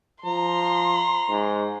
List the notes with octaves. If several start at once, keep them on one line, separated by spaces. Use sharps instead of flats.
F3 A#5 C6
G#2